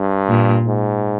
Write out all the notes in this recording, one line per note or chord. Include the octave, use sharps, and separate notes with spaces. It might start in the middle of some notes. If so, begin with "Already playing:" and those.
Already playing: G2
A#2
G#2